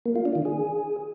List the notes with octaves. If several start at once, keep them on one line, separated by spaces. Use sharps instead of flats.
A#3
F4
D4
D#3
G#4